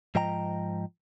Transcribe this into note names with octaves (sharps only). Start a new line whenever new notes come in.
G#2 F3 D#5 G5 A#5